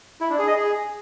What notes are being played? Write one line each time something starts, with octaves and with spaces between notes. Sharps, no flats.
E4
D4
G#4
D#5
G#4